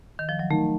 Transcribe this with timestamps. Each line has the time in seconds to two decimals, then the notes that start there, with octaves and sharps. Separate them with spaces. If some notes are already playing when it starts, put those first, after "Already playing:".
0.19 D#3
0.29 F3
0.39 F#3
0.50 D#3 A3